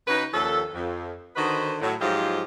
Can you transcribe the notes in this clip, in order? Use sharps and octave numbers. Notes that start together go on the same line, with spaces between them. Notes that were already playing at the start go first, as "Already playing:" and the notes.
C#3 D#4 F#4 B4
D#2 F3 C#4 A4
F2
D3 D#3 F#4 B4 C5 D#5
A2 F#3
G#2 F3 F#3 F4 G4 D#5